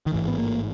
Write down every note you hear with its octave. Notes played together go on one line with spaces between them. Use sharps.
D#3
A1 G#2 E3
B3
A#3